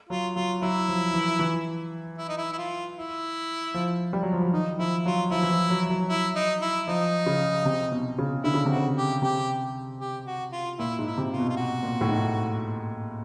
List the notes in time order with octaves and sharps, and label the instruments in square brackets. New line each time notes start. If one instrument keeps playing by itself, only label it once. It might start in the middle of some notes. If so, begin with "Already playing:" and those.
[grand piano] F#3 [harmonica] F4
[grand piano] F#3 [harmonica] F4
[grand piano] F#3 [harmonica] E4
[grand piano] F3
E3
E3
[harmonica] E4
D#4
E4
E4
F4
E4
[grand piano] F3
G3
F#3
F3
F#3
[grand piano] D#3 [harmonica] D#4
[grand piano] F3 [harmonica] E4
[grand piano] F#3 [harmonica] F4
[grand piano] F3 [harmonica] E4
[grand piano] E3
F3
F#3
F#3
[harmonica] E4
D#4
E4
[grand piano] F3 [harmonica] D#4
[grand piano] C#3
C3
B2
C#3
[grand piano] D3 [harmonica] E4
[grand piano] C#3
[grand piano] C3 [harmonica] F#4
[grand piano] C#3
[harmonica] G4
[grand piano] C3 [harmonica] G4
[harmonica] G4
F#4
F4
[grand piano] A#2 [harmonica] E4
[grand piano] G#2
[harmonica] E4
[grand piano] C3
[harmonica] F4
[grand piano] B2
[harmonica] F4
F#4
[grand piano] A#2
A2
G#2